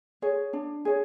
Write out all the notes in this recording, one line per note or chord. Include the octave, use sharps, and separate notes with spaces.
G#4 C#5
D4
G#4 C#5